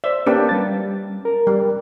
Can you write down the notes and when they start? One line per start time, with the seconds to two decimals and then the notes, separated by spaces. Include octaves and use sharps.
0.04 C5 D5 E5
0.27 A#3 C#4 D4 G4 B4
0.49 G3 C#4 A6
1.25 A#4
1.47 G3